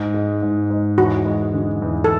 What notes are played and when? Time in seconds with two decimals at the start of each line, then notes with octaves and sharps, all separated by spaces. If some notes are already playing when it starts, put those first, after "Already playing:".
Already playing: G#2
0.14 G#3
0.42 G#2
0.70 G#2
0.98 E2 F#4
1.26 G#3
1.54 D3
1.82 E2
2.04 A4